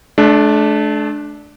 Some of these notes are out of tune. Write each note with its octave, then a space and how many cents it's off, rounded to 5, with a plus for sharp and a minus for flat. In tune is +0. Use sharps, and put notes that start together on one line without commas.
A3 -40 D4 +0